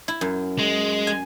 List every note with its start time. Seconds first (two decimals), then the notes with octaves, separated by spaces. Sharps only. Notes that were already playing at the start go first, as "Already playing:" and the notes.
0.08 E4
0.21 F#2
0.59 G#3
1.07 G#5